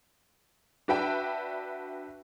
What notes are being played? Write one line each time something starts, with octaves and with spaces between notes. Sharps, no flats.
D4 F#4 B4 E5 G5 A5